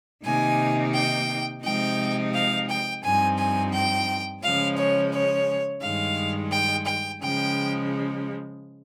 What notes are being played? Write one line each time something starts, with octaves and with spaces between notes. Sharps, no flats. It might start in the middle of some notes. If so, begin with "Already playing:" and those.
C3 D#3 A#3 D#4 G#5
G5
C3 F3 G#3 C4 D#4 G5
F5
G5
G2 F3 C4 D#4 G#5
G#5
G5
C#3 F3 G#3 C#4 F5
C#5
C#5
G2 D#3 G#3 F5
G5
G5
C#3 F3 G#3 G5